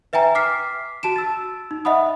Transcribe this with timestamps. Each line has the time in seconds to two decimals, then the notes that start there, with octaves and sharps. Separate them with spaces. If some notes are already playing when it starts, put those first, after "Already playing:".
0.13 B4 E5 G5 G#5 A#5
0.35 D6 F6 B6 C7
1.03 F#4 A5 D7 E7
1.16 E6 A6
1.71 D#4
1.85 D#5 E5 F#5 B5 D#6